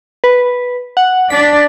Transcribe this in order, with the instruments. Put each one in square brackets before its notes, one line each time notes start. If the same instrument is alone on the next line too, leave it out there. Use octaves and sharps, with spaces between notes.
[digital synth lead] B4
F#5
[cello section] D4 D5 [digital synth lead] B6